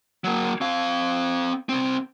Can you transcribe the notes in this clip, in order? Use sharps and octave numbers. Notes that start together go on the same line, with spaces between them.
F#3 A#3
C4 F5
C2 C4